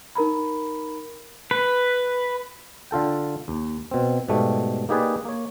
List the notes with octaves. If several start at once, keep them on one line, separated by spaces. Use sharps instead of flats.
D#4 A#4 A#5 B5
B4
D3 F4 A4 G5
D#2
B2 C4
G#2 B2 G3 A3
A#3 D#4 G4 G#4 B4 D5
A#3 C#5